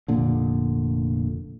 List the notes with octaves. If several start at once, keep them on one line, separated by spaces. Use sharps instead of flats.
F1 A#2 D3